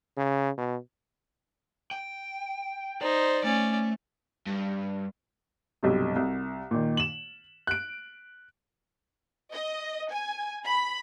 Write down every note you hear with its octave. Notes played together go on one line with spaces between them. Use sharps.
C#3
B2
G5
D#4 C5 D5
A3 C#4 D5
G2
B1 G2 C3
C2
A#2 D#3
E7 F#7
F#6 D7
D#5
G#5
B5